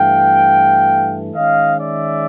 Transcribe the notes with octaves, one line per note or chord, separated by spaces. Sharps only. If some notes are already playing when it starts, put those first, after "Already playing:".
Already playing: G2 E3 A3 F5 G5
D#3 G#3 C#4 D#5 F5
D5 E5